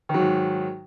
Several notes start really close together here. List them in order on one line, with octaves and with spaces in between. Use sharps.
D#3 F#3 G#2